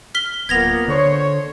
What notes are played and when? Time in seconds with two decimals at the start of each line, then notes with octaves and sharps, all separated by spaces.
0.15 F6 B6 G7
0.49 D1 A#2 A#3 B3 G#6 A#6 F7
0.88 D3 C5 C#5